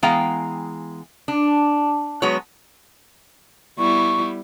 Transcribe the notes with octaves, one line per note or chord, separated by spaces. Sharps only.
E3 G#3 B3 F5 G5 A#5
D4
F#3 G#3 B3 F#4 B4 C#5
G3 B3 E4 C#6